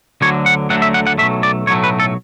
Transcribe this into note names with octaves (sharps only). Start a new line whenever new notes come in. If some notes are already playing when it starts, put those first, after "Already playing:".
D2 D3 F#3 C#5
F#5
D2 D3 F#3 A3 F#5
E5
F#5
F#5
B1 A2 F#3 A3 E5
D5
B1 A2 F#3 A3 C#5
B4
A4